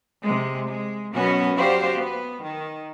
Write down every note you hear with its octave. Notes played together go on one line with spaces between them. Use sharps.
C3 G#3
G#3
F#2 B2 B3 C#4 F#4
F#3 F#4 G4 C5 D5 F5
B3
D#3